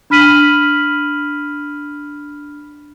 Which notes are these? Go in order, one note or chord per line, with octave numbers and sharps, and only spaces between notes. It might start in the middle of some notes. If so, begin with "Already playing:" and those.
D4 B5 F6 B6 D#7 F#7